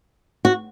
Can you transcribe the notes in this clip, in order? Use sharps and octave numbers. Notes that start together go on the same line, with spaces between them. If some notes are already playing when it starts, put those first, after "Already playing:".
F#4